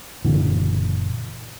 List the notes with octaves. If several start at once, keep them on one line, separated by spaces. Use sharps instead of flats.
F#1 A#2 D3 E3